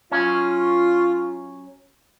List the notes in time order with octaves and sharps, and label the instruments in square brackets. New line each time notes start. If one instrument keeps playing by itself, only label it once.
[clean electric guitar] F#3 C#4 [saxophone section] F4